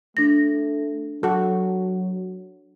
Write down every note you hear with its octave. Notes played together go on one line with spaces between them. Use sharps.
A3 D4 A#6
F#3 F#4 A4